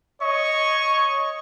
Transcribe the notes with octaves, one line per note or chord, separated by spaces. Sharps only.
C#5 D#5 C#6